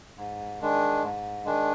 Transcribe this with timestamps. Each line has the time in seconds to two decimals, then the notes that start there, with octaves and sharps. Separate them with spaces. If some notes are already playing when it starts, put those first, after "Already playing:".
0.17 G#2
0.61 D#3 G#3 D4
1.03 G#2
1.45 D#3 G#3 D4